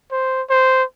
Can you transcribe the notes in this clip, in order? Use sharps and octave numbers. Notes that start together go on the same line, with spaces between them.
C5
C5